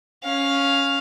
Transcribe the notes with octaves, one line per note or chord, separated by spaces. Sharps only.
C#4 F5